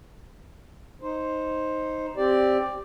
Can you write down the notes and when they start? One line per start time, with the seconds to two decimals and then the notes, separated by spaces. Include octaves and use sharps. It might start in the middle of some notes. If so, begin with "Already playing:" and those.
1.02 D#4 C5
2.17 C4 G4 D5